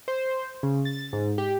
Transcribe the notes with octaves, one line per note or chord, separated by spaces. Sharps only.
C5
C#3
A6
G#2
G4